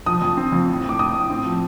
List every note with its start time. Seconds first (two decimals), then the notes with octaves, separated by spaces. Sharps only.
0.06 F3 D#6
0.22 F2
0.37 C4
0.52 F2
0.68 A2
0.83 A2
0.89 D6
0.99 A2 D#6
1.14 A2
1.30 C4
1.45 F3